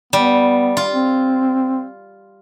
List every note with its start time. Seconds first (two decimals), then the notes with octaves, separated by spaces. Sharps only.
0.13 G3 B3
0.77 F4
0.93 C4